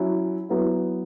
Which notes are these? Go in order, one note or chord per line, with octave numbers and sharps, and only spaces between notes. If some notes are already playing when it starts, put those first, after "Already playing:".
Already playing: F#3 C#4 E4
F#3 B3 E4